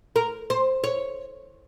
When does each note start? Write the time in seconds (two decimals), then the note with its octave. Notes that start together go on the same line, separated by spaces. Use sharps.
0.16 A#4
0.50 C5
0.84 C#5